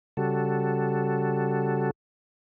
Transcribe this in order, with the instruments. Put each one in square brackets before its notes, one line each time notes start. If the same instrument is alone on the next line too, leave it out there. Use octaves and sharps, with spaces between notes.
[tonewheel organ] C#3 G3 F#4 A4